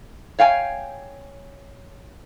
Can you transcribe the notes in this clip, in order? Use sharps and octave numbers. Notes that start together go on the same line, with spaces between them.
C#5 F5 G5 G#5